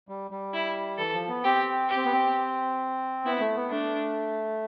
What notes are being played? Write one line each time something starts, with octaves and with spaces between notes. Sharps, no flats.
G3
G3
E4
E3 A4
F3
B3
C4 G4
G4
C4
B3
C4
B3 E4
A3
B3
A3 D4